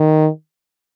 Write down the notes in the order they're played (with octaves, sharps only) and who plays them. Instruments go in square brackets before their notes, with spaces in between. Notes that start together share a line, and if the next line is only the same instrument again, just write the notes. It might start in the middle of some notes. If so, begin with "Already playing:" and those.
Already playing: [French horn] D#3